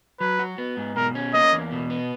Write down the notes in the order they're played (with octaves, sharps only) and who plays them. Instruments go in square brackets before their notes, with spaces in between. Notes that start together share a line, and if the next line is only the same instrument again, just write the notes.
[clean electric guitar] F#3 [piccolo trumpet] B4
[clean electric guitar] F#4
B3
G#2
[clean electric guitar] B2 [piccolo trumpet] A#4
[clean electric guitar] C#4
[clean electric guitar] A#3 [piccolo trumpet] D#5
[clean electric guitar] E2
B2
B3